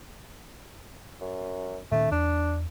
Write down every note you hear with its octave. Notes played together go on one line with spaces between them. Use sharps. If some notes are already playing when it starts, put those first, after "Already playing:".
F#2
A#2 D#3 A3 C#4
E2 D4